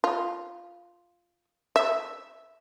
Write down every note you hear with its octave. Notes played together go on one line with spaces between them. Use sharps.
F4
E5